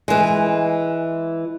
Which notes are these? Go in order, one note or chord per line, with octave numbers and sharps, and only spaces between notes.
E3 G#3